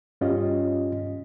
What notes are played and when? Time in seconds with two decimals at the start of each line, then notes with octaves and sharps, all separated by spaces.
0.21 G2 C#4 F4 G4 D#5